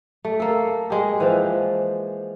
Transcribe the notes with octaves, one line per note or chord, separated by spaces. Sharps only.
A3
A#3 A4
G#3 G4
E3 F3